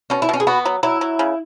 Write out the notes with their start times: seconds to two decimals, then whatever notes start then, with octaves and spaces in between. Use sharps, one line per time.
0.10 B2 C#4
0.22 E4
0.29 B2 C#4
0.40 G#4
0.47 B3 F#4
0.65 F#3
0.83 F#3 E4
1.01 F#3
1.19 C#3